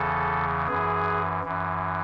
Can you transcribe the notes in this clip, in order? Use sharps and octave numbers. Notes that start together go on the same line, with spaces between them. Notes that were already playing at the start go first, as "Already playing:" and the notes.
Already playing: E2 C#3 E3 A4
F#2 E3 G#4
F#2 E3